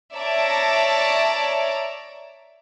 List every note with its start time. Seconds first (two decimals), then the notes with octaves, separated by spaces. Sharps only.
0.16 C#5 D5 E5 A5 A#5 D6